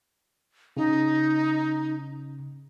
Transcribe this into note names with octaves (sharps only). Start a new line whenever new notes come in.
C#3 D#4